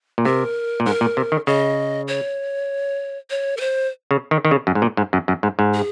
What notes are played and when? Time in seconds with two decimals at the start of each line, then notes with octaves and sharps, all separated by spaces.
0.18 A#2
0.25 C3 A#4
0.80 A#2
0.86 G#2 A#4
1.01 A#2
1.17 C3
1.32 D#3
1.47 C#3 D#5
2.08 C#5
3.30 C#5
3.57 A#4
3.60 C5
4.11 C#3
4.31 D#3
4.45 D#3
4.51 C#3
4.67 F#2
4.75 G#2
4.82 A#2
4.97 G#2
5.13 F#2
5.28 F#2
5.43 G#2
5.59 G#2
5.74 G#4